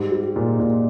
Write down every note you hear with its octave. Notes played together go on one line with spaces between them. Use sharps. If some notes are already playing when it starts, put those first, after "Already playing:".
Already playing: G#2 G3
G3
A#2
A#2